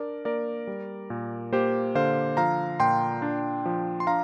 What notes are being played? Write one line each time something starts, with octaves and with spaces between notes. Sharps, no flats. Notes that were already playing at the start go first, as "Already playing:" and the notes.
Already playing: D4 A#4 D5
A#3 A#4 D5
G3
A#2
A#3 G4 C5
D3 C5 F5
F3 F5 A#5
A#2 G5 C6
D4
F3
C6
D4 F5 A#5